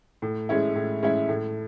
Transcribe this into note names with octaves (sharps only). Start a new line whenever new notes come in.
A2
G#3 C#4 E4
A2
G#3 C#4 E4
A2